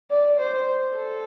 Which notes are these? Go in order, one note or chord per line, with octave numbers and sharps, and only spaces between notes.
D5
C5
A4